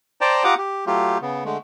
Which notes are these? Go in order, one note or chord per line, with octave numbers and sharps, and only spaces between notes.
C5 D5 G5 A5 A#5
F4 G4 F#5 A#5 D6 D#6
G4
F#3 A3 F4 G4
C#3 B3
D3 G#3 A3